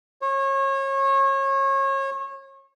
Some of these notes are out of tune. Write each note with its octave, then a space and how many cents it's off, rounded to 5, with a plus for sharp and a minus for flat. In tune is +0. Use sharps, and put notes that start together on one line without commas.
C#5 -30